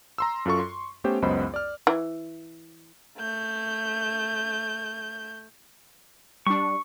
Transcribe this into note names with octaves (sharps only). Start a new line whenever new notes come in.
A#5 C6 E6
F#2 F4 A4 C#6
C6 C#6
A3 B3 C#4 G4 C5 G5
C#2 F#2 B3 C5 D#5 B5
D5 F6
E3
A3 G6
G3 D4 C#6